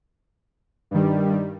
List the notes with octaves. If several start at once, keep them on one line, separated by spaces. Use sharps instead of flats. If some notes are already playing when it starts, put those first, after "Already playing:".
G2 D#3 G3